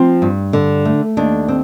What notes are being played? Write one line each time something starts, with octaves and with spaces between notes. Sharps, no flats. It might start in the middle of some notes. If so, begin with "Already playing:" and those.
Already playing: F3 C4
G2
D3
A3
D#2 D4
C4